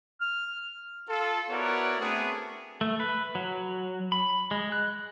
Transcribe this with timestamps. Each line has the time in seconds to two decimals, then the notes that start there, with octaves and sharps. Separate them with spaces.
0.21 F6
1.08 F4 A4
1.50 B3 E4 F#4 A#4 C#5 D5
1.99 A3 B3 C4 D4 F#4 G#4
2.81 A3
3.00 B4
3.35 F#3
4.12 B5
4.51 G#3
4.72 F#6